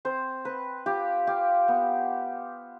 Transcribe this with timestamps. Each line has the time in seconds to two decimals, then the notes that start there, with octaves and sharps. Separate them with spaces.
0.05 C4 C5
0.45 C4 B4
0.86 F4 G4
1.27 F4 G4
1.68 B3